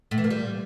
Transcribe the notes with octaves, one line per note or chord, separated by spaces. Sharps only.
A2
E3
A#3
G3